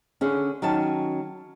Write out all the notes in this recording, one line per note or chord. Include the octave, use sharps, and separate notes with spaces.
D3 C#4 G#4
D#3 F#3 C#4 A5